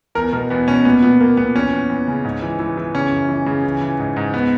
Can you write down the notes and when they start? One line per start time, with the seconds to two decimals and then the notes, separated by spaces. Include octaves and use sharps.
0.15 E2 A#4
0.33 B2 A#4
0.50 E2 B3
0.68 B2 C#4
0.85 A#2 B3
1.02 A#2 B3
1.20 A#2 A#3
1.37 A#2 B3
1.55 E2 C#4
1.73 E2
1.89 E2
2.08 C#3
2.24 G#2
2.42 E3
2.59 E3
2.77 E3
2.94 C#3 C#4
3.12 F#2
3.29 E3
3.46 C#3
3.64 E3
3.81 E3
3.99 G#2
4.16 G#2
4.34 B3